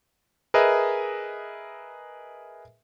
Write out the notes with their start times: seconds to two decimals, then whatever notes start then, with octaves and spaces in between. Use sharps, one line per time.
0.54 G#4 A#4 B4 D#5 E5